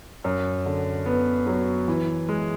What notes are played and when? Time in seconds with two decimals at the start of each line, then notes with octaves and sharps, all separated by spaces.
0.24 F#2
0.66 D3
1.06 B3
1.47 F#3
1.88 E3
2.29 G#3